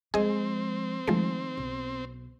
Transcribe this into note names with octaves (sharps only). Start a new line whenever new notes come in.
F3 G#3 C4 G#4 D#5
D#3 F3 G#3 A3
B1